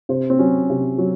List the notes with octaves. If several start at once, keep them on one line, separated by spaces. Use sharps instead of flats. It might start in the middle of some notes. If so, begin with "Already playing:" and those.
C3 C5
C4
F#3 C#4
C3
F#3